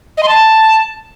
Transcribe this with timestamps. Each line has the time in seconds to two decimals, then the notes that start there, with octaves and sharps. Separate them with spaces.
0.17 D#5
0.23 C6
0.28 A5